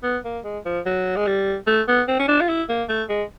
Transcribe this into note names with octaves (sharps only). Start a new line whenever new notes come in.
B3
A#3
G#3
F3
F#3
G#3
G3
A3
B3
C4
C#4
D4
F4
E4
A#3
A3
G#3